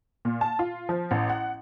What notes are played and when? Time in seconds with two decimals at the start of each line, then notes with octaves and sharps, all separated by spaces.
0.25 A#2
0.41 A5
0.59 F4
0.89 F3
1.11 A1
1.30 F#5